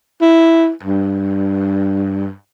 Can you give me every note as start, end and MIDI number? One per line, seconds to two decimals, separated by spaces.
0.21 0.71 64
0.83 2.34 43